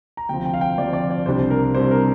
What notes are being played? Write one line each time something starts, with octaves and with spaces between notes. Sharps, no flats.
A#5
D2 C3 F3 G5
G5
F5
G5
D2 C3 F3 D5
D5
D5
C2 C3 G3 D4 C5
A#4
C2 C3 G3 D4 C5
A#4